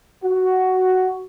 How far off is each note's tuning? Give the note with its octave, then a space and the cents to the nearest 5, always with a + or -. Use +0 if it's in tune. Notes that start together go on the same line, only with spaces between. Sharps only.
F#4 +5